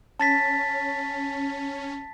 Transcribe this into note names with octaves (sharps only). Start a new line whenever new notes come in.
C#4 A5 A6 B6